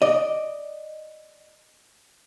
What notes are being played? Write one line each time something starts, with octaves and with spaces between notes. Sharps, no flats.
D5 D#5